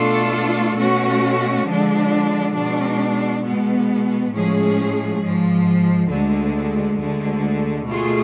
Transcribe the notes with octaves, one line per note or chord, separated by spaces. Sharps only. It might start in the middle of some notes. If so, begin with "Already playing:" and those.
Already playing: B2 A3 D4 F4 A4
B2 A3 C#4 F#4
D3 F3 G#3 D4
B2 G#3 D4
B2 G#3 B3
A2 F3 G#3 C#4 G#4
G#2 F3 G#3
D2 D3 G#3
D2 D3 G#3
B2 A3 F4 G#4